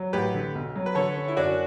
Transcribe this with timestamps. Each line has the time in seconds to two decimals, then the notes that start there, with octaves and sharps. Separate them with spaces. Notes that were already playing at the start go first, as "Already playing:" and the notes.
Already playing: F#3
0.13 A1 G4 B4
0.34 D3
0.55 B1
0.76 F#3
0.86 B4
0.95 D3 A4 C#5
1.16 C#4
1.28 E4
1.37 F#2 D4 F#4